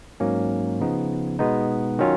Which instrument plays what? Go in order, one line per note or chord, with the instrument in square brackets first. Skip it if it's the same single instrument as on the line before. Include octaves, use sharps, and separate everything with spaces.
[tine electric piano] G#2 F#3 A#3 C#4
C#3 F3 B3 D#4
B2 G#3 B3 D#4
D#3 F#3 C#4 F4